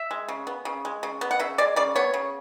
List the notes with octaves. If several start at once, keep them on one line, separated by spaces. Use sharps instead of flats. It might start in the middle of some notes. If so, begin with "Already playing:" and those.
Already playing: E5
G#3
C#3
B3
C#3
G#3
C#3
B3
F#5
C#3 E5
G#3 D5
C#3 D5
B3 C#5
C#3